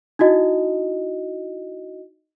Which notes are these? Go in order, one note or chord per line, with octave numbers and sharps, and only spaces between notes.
D#4 E4 F#4 D#5